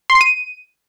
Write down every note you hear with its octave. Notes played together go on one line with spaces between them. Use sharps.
C6
C7
D#7